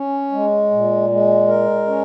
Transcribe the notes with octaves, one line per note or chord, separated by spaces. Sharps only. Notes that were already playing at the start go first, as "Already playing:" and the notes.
Already playing: C#4
G#3
A#2
G#3
A#4
C#4